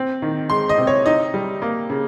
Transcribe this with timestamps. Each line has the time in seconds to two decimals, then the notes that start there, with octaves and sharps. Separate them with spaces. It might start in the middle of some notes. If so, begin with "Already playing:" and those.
Already playing: C4
0.22 D#3
0.50 G#3 C6
0.69 D#5
0.78 C3
0.87 C#5
1.06 D#4 D#5
1.34 G3
1.62 A#3
1.90 C#3